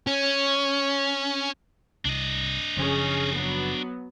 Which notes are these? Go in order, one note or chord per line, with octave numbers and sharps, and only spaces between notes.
C#4
C2 D4 D#5
F#1 C#3 F3 C#4 G#4
F#3 B3